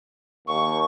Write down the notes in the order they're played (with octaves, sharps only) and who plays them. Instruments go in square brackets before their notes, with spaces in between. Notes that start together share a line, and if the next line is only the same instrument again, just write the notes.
[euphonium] D#2 [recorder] C#6